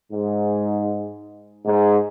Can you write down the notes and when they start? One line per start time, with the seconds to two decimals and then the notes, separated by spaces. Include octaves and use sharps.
0.12 G#2
1.66 G#2